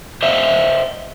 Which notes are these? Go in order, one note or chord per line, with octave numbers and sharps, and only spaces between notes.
C5 D#5 E5